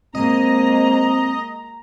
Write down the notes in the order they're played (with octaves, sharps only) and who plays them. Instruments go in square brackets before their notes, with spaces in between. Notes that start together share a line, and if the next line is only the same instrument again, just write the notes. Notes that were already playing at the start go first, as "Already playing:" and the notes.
[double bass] G#3 A#3 [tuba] C4 [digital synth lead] D#5 [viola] A#5